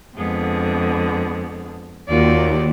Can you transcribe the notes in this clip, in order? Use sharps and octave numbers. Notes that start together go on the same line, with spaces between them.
F2 D3 G#3 B3 G#4
D#2 D#3 F4 F#4 D5